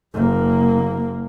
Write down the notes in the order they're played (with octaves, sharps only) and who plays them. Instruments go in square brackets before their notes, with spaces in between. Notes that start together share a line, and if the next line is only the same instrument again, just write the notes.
[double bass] F#1 A#3